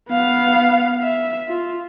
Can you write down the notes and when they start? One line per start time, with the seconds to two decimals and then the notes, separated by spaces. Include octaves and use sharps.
0.10 B3 F5
1.02 E5
1.49 F4